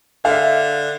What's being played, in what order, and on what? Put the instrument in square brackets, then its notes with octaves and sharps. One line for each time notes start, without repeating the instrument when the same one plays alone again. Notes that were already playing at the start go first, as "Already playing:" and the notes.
[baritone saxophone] D3 [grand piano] E5 F5